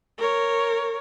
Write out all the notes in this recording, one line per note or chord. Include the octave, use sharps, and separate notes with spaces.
A#4 C#5